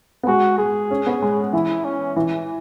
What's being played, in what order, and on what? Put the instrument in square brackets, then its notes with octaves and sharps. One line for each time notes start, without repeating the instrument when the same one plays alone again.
[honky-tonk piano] B3
[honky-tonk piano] G#3 [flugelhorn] F#4
[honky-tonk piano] G#3 [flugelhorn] G#4
[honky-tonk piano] C#4
B3
G#3
[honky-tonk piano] E3 [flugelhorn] E4
[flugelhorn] C#4
[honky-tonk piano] E3